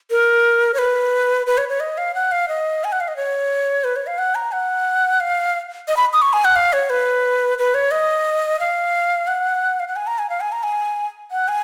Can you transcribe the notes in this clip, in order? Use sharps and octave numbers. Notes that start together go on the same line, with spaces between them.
A#4
C#5
B4
B4
C#5
C#5
D#5
F5
F#5
F5
D#5
G#5
F#5
F5
D#5
C#5
B4
C#5
F5
F#5
A#5
F#5
F5
D#5
B5
D#6
C#6
G#5
F#5
F5
C#5
B4
B4
C#5
D#5
F5
F#5
F5
F#5
G#5
A#5
G#5
F5
G#5
A#5
G#5
F#5
G#5